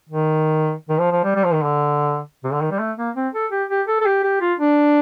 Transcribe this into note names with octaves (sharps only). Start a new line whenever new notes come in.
D#3
D#3
F3
F3
G3
G3
F3
D#3
D3
C3
D3
D#3
G3
A3
A#3
C4
A4
G4
G4
A4
A4
G4
G4
F4
D4